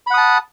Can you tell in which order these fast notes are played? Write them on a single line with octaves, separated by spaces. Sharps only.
B5 F#5 D#6 A5